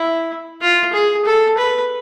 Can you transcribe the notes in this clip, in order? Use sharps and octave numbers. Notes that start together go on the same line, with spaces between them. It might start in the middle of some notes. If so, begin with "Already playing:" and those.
Already playing: E4
F4
G#4
A4
B4